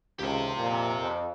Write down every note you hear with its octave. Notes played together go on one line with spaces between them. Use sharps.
G#1 C#2 G4 C5
F2 A#2
F2